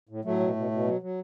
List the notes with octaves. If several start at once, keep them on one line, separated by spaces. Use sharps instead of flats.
A2
A2 F#3 A3
B2
B2
B2
F#3
F#3